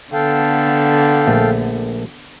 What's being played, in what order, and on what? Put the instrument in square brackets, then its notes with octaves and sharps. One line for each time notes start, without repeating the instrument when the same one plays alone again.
[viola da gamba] D3 B3 [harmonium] A4 F5 G5
[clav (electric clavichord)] A#1 A3